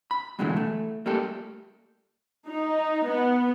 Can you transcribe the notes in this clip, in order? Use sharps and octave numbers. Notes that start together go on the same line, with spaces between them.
B5
G2 B2 D3 E3 G#3 A3
A3
G3 A3 A#3 G4 A4
D#4
B3